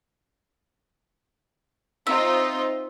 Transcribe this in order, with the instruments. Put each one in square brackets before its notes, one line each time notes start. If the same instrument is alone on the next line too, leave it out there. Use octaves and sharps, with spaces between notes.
[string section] C4 D#4 F4 [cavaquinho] E5